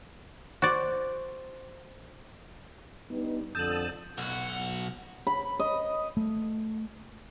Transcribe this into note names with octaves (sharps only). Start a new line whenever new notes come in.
F#4 C5 D5
G3 B3 D4 D#4
F2 D3 A5 D#6 E6 G6 E7 F#7
B1 F#4
B5
D#5
A3